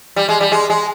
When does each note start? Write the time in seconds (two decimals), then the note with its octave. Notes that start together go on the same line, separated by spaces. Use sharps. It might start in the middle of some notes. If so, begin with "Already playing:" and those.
0.16 G3
0.29 G#3
0.41 G3
0.52 G#3
0.70 G#3